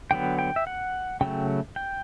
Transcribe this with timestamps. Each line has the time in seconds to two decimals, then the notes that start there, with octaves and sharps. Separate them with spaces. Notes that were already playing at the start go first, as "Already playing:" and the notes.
0.11 D3 F#3 B3 G5
0.39 G5
0.56 E5
0.67 F#5
1.21 C#3 F#3 A3 G5
1.76 G5